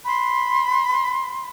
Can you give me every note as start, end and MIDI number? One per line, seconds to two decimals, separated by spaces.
0.05 1.49 83
0.05 1.49 84